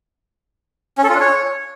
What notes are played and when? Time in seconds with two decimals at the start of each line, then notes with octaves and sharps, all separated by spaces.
0.98 C#4
1.03 A4
1.09 F4
1.15 D4
1.20 C#5